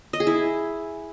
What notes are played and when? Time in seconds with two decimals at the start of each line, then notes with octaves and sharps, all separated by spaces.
0.13 D#5
0.20 G#4
0.27 E4